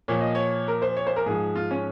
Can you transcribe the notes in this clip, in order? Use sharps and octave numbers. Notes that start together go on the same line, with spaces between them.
A#2 F3 C#5
D#5
C#5
A#4
C5
C#5
C5
A#4
G#2 F3 G#4
F4
C#4